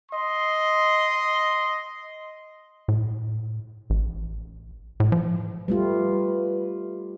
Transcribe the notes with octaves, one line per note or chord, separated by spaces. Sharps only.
D#5 C6
A2
A1
A2
F3
G3 A3 F4 B4